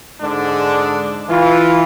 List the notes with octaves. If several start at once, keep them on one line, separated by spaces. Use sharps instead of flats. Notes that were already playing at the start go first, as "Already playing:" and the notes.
G#2 D3 G#3 D4
E3 F4